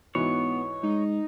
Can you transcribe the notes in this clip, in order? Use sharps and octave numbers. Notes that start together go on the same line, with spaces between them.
G#2 E3 B3 F#4 C#5
G#3 D#4